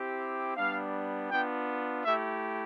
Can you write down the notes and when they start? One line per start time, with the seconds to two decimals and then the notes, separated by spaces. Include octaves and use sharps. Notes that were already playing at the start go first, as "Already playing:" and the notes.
Already playing: C4 E4 G4
0.57 G3 B3 D4 F5
1.31 B3 D4 F4 G5
2.05 A3 E4 G4 E5